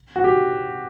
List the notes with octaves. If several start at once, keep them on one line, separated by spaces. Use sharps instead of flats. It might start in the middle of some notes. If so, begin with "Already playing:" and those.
F#4
G4